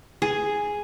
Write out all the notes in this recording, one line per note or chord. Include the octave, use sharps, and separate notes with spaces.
G#4